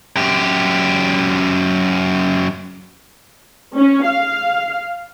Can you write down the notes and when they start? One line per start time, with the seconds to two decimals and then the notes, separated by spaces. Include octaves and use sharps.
0.17 F#2 G4
3.76 C#4
4.06 F5